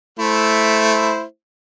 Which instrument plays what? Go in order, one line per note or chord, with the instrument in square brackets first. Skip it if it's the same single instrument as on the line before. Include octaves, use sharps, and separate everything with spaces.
[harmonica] A3 E4 C5